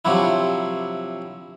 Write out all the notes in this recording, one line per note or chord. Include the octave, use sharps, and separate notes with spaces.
C3 F3 F#3 D4 E4